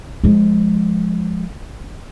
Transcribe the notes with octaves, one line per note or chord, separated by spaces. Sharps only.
F3 G#3